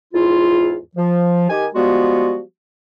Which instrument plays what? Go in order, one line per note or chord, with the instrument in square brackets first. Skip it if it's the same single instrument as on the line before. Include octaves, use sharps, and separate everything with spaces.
[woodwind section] E2 G#2 E4 F4
F3
D#3 G4 G#5
F3 G3 G#3 B3 F#4